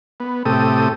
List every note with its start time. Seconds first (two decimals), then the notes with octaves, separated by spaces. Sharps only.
0.20 B3
0.45 A2 C3 G4 A4 D#6